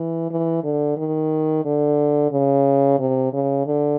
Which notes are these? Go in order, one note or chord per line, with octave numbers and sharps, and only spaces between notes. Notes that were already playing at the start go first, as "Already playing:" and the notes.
Already playing: E3
E3
D3
D#3
D3
C#3
C3
C#3
D3